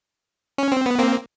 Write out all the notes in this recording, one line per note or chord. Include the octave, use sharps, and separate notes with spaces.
C#4
C4
B3
A#3 C4